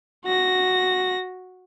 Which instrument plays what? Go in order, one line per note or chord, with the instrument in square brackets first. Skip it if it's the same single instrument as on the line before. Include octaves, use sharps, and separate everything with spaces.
[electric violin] F#4 A#6